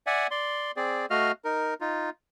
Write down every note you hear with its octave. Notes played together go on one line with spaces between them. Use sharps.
D5 E5 F#5 G#5
D5 C6
C4 G#4 D5
A3 F#4 D#5 F5 F6
D#4 A#4
D#4 F4